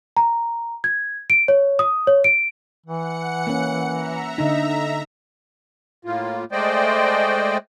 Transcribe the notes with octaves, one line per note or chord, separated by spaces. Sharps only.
A#5
G#6
D7
C#5
D#6
C#5
D7
E3 F#5 C#7
A#3 C#4
E5 A#5
D3 D#4
A2 A#3 F4
G#3 A3 C5 D5 D#5 G5